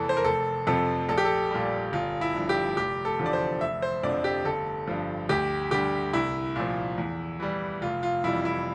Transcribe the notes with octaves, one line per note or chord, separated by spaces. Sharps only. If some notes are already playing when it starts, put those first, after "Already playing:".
Already playing: F1 E2 E3 A4
C5
A#4
F1 A4
F2 C3 F3 A4
A#1 A4
G4
A4
A#2 G3
G1 F4
E4
G2 F3
G4
F1 G4
A4
E2 D3 F3
D5
C5
F1 E5
C5
F2 D3 F3 D5
G4
G1 A4
G2 F3
D2 G4
D3 G3 G4
C2 E4
A#2 F3
E2
E3 G3
F1 F4
F4
F2 E3 G3 E4
E4